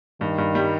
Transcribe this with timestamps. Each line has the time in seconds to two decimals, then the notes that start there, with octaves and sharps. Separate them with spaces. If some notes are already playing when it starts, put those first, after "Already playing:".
0.21 G2 D#3
0.38 G2
0.55 G3